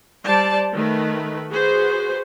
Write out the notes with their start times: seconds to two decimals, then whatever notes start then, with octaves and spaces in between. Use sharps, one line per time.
0.25 G3 C5 D5 A5
0.74 D#3 A3 B4
1.49 F#4 G#4 B4 C5